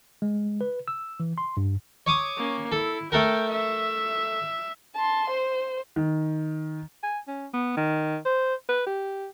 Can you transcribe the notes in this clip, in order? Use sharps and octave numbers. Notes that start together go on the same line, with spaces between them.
G#3
B4
E6
E3
C6
G2
C#5 D6 D#6
A#3 C#4
E4 A4
A3 A4 A#4 G5
E5
A5 C6
C5
D#3
G#5
C#4
B3
D#3
C5
B4
G4